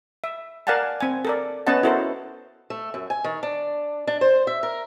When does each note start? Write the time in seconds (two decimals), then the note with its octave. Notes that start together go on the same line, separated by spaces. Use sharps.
0.24 E5
0.67 A#4 D5 F5 F#5 G#5 A5
1.00 C4 G#5
1.25 A4 A#4 D5
1.67 B3 C#4 B4 D#5 F#5 A5
1.83 E4 F#4 A4 A#4 C5
2.70 A3
2.94 F#2
3.10 G#5
3.24 D#3
3.43 D4
4.07 D4
4.21 C5
4.47 E5
4.63 A#4